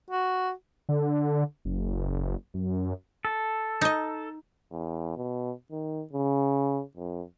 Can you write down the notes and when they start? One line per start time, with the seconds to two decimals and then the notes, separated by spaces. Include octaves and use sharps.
0.11 F#4
0.89 D3
1.65 F#1
2.54 F#2
3.25 A4
3.81 D#4 D#5
4.72 E2
5.17 B2
5.72 D#3
6.13 C#3
6.97 F2